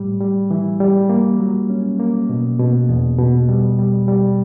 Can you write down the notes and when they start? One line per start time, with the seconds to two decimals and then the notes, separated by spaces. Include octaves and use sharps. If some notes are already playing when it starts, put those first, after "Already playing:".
Already playing: A2 G3
0.20 G3
0.51 E3
0.80 G3
1.10 A#3
1.40 F#3
1.70 C#4
2.00 A#3
2.29 B2
2.59 B2
2.89 E2
3.18 B2
3.49 G3
3.79 G3
4.08 G3